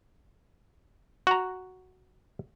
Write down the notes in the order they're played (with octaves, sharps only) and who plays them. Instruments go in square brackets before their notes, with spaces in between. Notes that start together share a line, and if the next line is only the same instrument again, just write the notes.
[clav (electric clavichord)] F#4 A#5